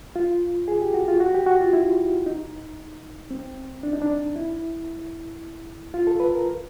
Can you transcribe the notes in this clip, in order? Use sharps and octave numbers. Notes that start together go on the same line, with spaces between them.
F4
G#4
G4
F#4
F4
F#4
G4
F#4
F4
E4
D#4
C4
D4
D#4
D4
E4
F4
A4
B4
A#4